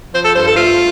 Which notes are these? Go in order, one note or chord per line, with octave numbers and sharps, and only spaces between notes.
F3 C5
A4
G2 C5
A4
A3 F4